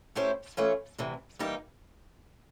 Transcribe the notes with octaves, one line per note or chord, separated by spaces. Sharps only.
A3 C#4 E4 G4 C5
E3 A3 C#4 F4
D2 C3 E3
E3 G3 A#3 D#4 G4